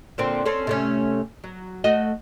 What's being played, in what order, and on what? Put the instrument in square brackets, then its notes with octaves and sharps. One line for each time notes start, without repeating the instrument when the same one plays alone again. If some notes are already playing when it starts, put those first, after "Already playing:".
[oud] A#2 D3 C4
C4 C#4 A4
C3 A3 C#4
F#3
A3 F#4 D#5